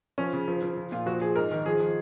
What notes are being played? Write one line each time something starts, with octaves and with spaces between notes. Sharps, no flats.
F3 C#4
C#3
F3
F3
F3
A#2 F4
F3 F#4
F3 G#4
G#2 A#4
D#3
F3 G#4
F3